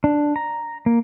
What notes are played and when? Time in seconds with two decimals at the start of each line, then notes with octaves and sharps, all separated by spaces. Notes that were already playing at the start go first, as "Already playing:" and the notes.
0.04 D4
0.36 A#5
0.86 A#3